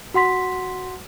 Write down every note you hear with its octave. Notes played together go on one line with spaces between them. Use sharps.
F#4 F#5 C6 B6